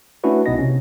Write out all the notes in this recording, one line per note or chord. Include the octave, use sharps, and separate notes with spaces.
A3 C#4 D4 E4 F#4 B4
B1 B2 B3 D#4 D#5 A#6
C3 C#4